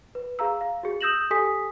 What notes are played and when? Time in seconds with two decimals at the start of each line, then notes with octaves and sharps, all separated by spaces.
0.15 B4
0.39 G#4 F5 A#5 E6
0.61 F5
0.83 F#4 G#4
1.01 D#6 E6 G6 A#6 E7 F#7
1.31 G4 A4 G#5 D#6 B6